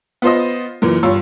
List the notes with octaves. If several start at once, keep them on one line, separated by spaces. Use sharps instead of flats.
B3 F4 C5 D#5
F#2 A#2 E3
G2 F4 C#5 E6